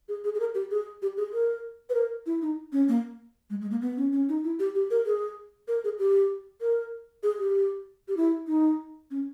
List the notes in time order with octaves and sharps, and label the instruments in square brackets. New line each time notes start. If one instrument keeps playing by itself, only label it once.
[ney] G#4
G#4
G#4
A#4
G4
G#4
G4
G#4
A#4
B4
A#4
E4
D#4
C#4
A#3
G#3
G#3
A#3
B3
C#4
C#4
D#4
E4
G4
G4
A#4
G#4
A#4
G#4
G4
A#4
G#4
G4
G4
E4
D#4
C#4